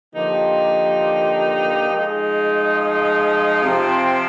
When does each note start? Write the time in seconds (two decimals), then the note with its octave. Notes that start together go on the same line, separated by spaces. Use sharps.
0.15 D3 F3 A#3 D#4 G4
1.88 F3 G#3 D#4 G#4
3.61 C3 F3 C4